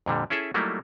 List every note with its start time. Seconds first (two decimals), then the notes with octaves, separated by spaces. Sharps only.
0.06 F2 A#2 D3 G3
0.30 C#4 E4 G#4 A4 E5
0.54 F#3 G3 A3 A#3 D#4 E4